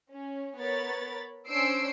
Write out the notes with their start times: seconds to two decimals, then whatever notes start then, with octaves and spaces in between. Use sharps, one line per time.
0.11 C#4
0.59 B3 A#4 C#5 B5 A6
1.48 C#4 D4 C5 E6 C7 D7